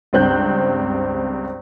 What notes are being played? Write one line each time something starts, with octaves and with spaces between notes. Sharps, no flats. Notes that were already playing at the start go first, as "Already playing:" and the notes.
C#2 G2 C4 F#6 G6